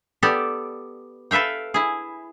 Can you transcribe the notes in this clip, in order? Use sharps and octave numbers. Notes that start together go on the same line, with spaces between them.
B3 G4 A4 D5
A4 B4 E5 F5 G5
E4 G#4